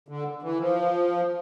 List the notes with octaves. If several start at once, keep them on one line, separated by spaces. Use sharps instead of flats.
D3
E3
F3